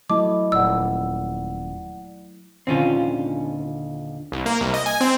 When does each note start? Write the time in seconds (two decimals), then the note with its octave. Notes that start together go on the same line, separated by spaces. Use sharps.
0.10 F#3 A3 E4 D#5 A5 D6
0.52 D#1 D5 F#5 E6
2.67 D#1 D3 C4 C#4 F4
4.32 C2
4.46 A#3
4.61 C2
4.74 D#5
4.86 G#5
5.01 C4